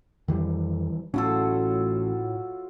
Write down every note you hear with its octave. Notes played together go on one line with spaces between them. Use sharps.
F2 D#3 E3 G3
A1 A2 F#3 C#4 F4 A4